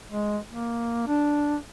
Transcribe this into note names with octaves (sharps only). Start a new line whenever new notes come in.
G#3
A#3
D4